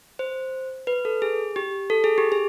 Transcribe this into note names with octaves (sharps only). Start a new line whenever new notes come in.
C5
B4
A4
G#4
G4
A4
G#4
G4
G#4